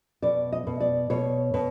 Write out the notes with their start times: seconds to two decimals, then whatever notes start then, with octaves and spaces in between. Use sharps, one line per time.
0.22 B2 D5
0.52 D#5
0.67 B2
0.80 D5
1.10 B2 C#5
1.54 B2